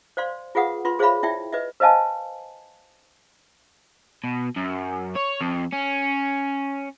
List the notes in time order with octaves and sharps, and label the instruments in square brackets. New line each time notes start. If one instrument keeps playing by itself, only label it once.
[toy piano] C5 D5 F5 C6
F4 G#4 B4 F5 F#5 D#6
F4 B4 C6
G#4 C5 C#5 E5 F5 B5
E4 D5 E5 G5
B4 D#5 E5
B4 C5 D#5 F5 G#5 A5
[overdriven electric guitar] B2
F#2
C#5
F2
C#4